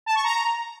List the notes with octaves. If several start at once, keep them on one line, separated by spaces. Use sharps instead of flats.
A5
C#6
A#5